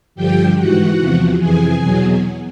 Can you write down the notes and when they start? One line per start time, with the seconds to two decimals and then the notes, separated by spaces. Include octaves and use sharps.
0.15 G2 D3 F3 G4 G5
0.56 G#2 E3 F#4 F#5
0.98 E2 C3 F3
1.39 F2 C3 E3 G#4 G#5
1.80 E2 B2 F#3